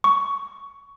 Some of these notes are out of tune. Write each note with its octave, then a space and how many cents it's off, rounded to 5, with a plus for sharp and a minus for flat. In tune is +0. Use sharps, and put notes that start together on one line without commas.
C#6 +15